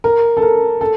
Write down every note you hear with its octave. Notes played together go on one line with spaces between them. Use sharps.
A#4
A4
A#4
A4